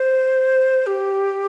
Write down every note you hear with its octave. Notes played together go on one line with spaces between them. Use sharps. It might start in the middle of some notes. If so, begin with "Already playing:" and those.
Already playing: C5
G4